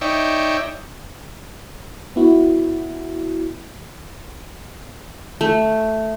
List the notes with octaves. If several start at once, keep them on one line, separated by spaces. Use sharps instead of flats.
D#4 C#5 D5 E5 G5
B3 E4 F#4
A3